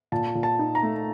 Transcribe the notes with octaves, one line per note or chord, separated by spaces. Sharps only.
A#2 A5
A#2
A5
D#4
A#5
A3